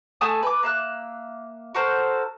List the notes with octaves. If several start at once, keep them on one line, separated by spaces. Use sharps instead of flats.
A3 G#5 A5 D#6
B4 D6
A#3 E5 F#6
F#4 A4 A#4 C5